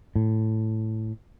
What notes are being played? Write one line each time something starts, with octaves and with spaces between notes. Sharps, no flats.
A2